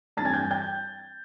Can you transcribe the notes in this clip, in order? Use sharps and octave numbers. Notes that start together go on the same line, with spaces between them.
G2 E3 G3 C4 E4 A5 A6
G#5 G#6
G5 G6
G5 G6